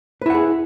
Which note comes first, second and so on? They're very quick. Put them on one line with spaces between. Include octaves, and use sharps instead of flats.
B4 E4 F#5 G#4